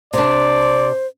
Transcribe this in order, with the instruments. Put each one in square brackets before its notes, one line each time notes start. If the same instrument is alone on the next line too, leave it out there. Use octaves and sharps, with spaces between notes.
[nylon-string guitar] C3 D4 [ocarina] C5 [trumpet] D5